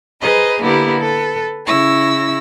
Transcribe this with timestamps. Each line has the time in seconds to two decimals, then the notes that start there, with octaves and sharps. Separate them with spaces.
0.20 G#4 B4 C5 D#5 A#5
0.60 D3 A#3 B3 E4 G4 A#4
0.99 A4 B4
1.65 C#3 E4 C#6 E6 A#6